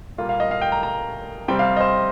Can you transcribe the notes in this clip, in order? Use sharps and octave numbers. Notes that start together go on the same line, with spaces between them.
A#2 G3 A#3 F4
F5
D#5
F5
G5
A#5
A#5
C3 G3 C4 G5
F5
D#5
C5